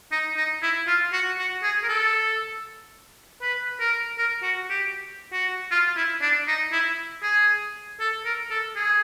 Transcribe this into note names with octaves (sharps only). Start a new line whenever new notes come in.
D#4
D#4
E4
F4
F#4
F#4
G#4
A#4
A4
B4
A#4
A#4
F#4
G4
F#4
F4
E4
D4
D#4
E4
G#4
A4
A#4
A4
G#4